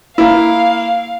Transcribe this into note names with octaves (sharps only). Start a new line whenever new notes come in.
A#3 E4 F5